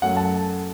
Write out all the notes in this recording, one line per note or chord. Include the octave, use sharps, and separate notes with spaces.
F#2 F#3 A3 F#5
A5